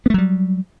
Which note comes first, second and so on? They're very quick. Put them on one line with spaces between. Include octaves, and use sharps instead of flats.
B3 A3 F#3 G3